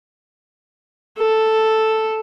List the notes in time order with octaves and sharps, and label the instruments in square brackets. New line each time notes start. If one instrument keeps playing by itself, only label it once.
[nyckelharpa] A4